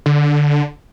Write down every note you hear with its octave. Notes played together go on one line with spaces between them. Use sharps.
D3